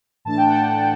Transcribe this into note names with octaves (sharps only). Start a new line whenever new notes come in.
A2 E3 A3 D4 A5
G5
F#5